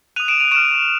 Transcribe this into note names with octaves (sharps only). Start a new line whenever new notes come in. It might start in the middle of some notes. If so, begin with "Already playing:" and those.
D#6 F#6 D#7 F7
D7 E7
D#7 F7
C#6 F6 D7 E7